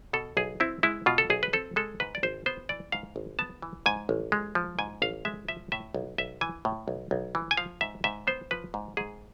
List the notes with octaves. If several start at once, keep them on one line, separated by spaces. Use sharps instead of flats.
B2 A4
B1 G#4
C4 E4
G#3 E4
B2 F4
A4
B1 G#4
B4
C4 A4
G#3 A4
G#2 B4
D5
G#1 C5
B3 C5
E3 D5
G#2 F5
G#1
B3 A5
E3
G#2 G#5
A1
G#3
F3
G#2 G#5
A1 F5
G#3 E5
F3 E5
A2 E5
B1
B1 E5
E3 G#5
A2
B1
B1
E3
G#5
F3 F5
G#2 E5
G#2 E5
B3 C5
F3 B4
G#2
G#2 G#4